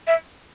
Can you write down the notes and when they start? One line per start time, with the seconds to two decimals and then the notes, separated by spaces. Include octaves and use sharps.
0.07 E5